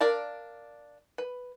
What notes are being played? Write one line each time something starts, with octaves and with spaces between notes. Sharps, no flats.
D4 A#4 D5 F5 A5
B4